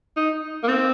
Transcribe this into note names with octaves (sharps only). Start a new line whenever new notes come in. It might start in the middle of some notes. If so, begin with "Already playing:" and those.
D#4
A#3
C4